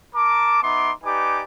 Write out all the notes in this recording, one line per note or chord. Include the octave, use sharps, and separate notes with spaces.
A#4 A5 A#5 D6
B3 D#4 E5 C6 D6
D#4 G4 B4 D5 G#5 D6